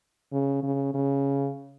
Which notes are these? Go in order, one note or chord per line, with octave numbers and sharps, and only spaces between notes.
C#3
C#3
C#3